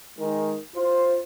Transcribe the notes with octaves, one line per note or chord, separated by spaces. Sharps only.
D#3 G#3
F4 C5